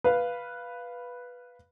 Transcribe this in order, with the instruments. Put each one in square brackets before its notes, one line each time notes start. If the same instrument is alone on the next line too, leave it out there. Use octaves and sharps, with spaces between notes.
[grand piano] B4 F5